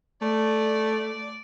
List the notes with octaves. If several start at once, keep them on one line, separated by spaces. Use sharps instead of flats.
A3 D5